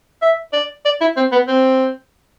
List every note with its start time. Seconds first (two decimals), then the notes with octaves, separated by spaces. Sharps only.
0.22 E5
0.53 D5
0.85 D5
1.01 E4
1.17 C4
1.32 B3
1.48 C4